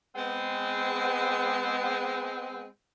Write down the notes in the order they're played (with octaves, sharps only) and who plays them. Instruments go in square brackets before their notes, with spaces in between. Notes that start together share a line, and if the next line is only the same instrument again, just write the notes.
[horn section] G#3 B3 C4